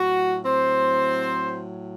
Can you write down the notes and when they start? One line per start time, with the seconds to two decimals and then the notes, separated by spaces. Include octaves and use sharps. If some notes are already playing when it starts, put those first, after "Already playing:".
Already playing: A2 F#3 F#4
0.43 C4 C5